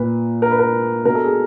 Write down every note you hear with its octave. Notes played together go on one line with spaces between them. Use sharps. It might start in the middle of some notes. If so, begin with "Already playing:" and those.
Already playing: A#2 B4
A#4
B4
A#4
B2 A#4
A4
G#4